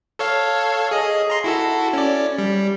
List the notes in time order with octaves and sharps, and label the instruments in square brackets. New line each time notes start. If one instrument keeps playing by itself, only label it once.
[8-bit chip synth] A4 C#5 F5
G#4 D#5
A#5 C6
E4 F#4 A4
C#4 D5
G3